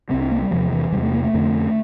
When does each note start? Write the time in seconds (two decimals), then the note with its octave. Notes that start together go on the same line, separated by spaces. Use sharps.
0.10 C2 C3 C4
0.20 D4
0.32 A#3
0.42 G3
0.51 E2 C3 F3
0.72 E3
0.92 E2 C3 G3
1.03 A3
1.13 A#3
1.24 A3
1.34 F2 D3